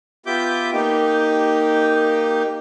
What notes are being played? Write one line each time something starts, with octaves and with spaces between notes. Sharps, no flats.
B3 F4 G4 E5 D6 G6
A#3 D#4 G4